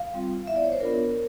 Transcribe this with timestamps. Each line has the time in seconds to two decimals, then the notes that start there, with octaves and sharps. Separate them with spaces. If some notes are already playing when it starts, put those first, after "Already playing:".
Already playing: F5
0.14 G3 C4 F4
0.47 B3 E4 E5
0.56 D5
0.64 C#5
0.72 C5
0.80 B3 D4 F4 A#4